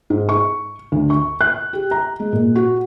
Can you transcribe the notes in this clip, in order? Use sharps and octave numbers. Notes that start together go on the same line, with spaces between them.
G#2
C#6
D2
C#6
F#6
G4
A#5
G#3
A#2
F#4